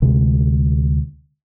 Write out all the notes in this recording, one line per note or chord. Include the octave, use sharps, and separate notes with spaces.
D2 C3 G#3